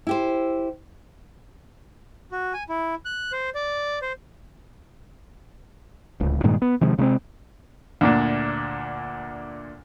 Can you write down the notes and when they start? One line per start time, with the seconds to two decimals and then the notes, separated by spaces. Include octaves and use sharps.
0.07 E4 G4 C5
2.32 F#4
2.54 G#5
2.69 E4
3.05 F#6
3.32 C5
3.55 D5
4.02 C5
6.20 D1 C#2
6.43 G2 A#2 D#3 G#3
6.62 B3
6.81 C3 D#3 F3 G#3
6.98 C3 G#3 A3 C4
8.01 D2 A#2 D4